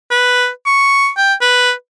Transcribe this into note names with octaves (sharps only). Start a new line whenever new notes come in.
B4
C#6
G5
B4